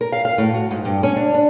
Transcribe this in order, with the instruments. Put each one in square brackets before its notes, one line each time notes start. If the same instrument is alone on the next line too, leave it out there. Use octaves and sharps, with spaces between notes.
[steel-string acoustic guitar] A#4
F5
F5
A2
F#4
G#2
G2
C#4
D4
D4